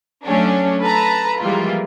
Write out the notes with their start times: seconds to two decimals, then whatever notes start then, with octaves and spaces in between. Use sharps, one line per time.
0.25 F#3 A3 C#4 D4
0.82 A4 B4 A5 A#5
1.40 E3 F3 G3 G#3 A#3 F4